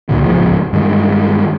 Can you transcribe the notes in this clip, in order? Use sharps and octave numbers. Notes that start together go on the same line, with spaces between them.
C#2 A#2 D3
D1 G#1 C#2 F3
G2 D#3 G#3